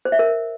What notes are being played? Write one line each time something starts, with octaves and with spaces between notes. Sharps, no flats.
C5
E5
A#4